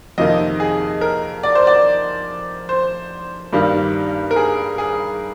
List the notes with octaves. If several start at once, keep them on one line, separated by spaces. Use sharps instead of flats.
F2 C3 D#3 A#3 D#5
G#4
A#4
D5
C5
D5
C5
G2 D#3 G3 A#3
A#4
G#4
G#4